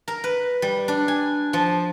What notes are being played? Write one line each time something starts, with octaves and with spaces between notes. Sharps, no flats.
A#4
B4
G3
D4
G#5
F3